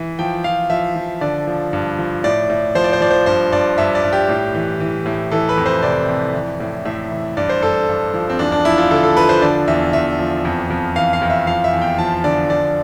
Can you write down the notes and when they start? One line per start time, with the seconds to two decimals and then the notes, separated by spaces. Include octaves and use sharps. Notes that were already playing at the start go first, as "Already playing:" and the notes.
Already playing: E3
0.19 F3 G5
0.44 F3 F5
0.70 F3 E5
0.96 F3
1.21 D3 D5
1.47 F3
1.73 G2
1.99 F3
2.24 A2 D5
2.50 A2
2.75 F3 C5
2.84 D5
2.93 C5
3.01 F3 D5
3.11 C5
3.26 G2 C5
3.52 G2 D5
3.78 G2 E5
3.95 D5
4.04 G2
4.13 G4
4.29 A2
4.55 E3
4.80 E3
5.06 A2
5.32 E3 A4
5.49 B4
5.57 F2
5.66 C5
5.83 C3 D5
6.08 F2
6.34 E3
6.60 A2
6.85 A2 E5
7.11 E3
7.37 G2 D5
7.49 C5
7.62 G2 A4
7.89 G2
8.14 F3
8.30 C4
8.39 E2 D4
8.52 D4
8.65 F3 E4
8.78 F4
8.91 D3 A4
9.04 A4
9.16 F3 B4
9.29 C5
9.42 D3 D5
9.68 E2 E5
9.93 E2 E5
10.19 F3
10.45 F2
10.70 F2
10.96 E3 F5
11.13 F5
11.22 F2
11.30 E5
11.47 F3 F5
11.64 E5
11.73 E2
11.82 G5
11.98 F3 A5
12.24 D3 D5
12.50 F3 D5